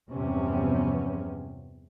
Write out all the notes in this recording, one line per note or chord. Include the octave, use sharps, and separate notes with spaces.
E2 G2 C3 F3 B3 C#4